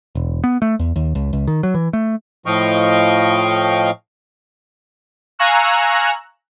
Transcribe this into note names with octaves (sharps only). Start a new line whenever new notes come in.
E1
B3
A3
E2
D#2
C#2
C#2
D#3
F#3
E3
A3
A2 F3 D#5 F5 G5 C#6
F5 G#5 A#5 C#6 E6 F#6